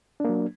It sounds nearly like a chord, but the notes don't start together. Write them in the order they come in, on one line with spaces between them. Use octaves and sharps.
D4 A#3 F#3